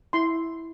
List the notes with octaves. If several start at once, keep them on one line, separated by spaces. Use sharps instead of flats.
E4 C6